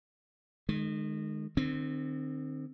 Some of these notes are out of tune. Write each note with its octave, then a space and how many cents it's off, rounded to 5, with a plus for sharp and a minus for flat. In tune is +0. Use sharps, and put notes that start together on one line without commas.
D#3 -30 G#3 +15
D#3 -45 C4 +0